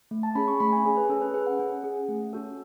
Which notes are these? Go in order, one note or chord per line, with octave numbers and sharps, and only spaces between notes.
A3
A5
C#4 G#4 B5
C#6
A3 B5
G#5
C#4 G#4
B4
C#4 A4
B4
G#4 B4
F#5
C#4
G#4
A3
C#4 F#4 A4